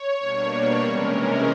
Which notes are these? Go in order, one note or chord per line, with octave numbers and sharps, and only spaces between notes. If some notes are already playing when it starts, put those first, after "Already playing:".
Already playing: C#5
B2 G3 A#3 D4
C3 E3 G#3 C#4 A#4